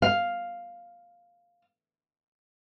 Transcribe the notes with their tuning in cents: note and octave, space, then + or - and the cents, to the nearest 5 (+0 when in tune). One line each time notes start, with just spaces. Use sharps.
F5 +0